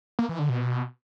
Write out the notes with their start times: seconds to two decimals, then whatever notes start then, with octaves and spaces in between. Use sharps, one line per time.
0.19 A#3
0.29 E3
0.39 D3
0.49 B2